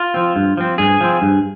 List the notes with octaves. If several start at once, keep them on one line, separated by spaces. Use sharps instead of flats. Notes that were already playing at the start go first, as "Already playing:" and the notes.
Already playing: F4
F3 C4
G2
F3 C4
G2 G#4
F3 C4
G2